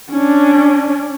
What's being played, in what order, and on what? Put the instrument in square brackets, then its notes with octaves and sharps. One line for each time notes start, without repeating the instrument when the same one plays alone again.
[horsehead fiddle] C#4 D4